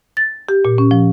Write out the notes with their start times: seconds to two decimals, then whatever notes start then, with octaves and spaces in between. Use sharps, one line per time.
0.17 A6
0.49 G4
0.65 A#2
0.78 C#4
0.91 F3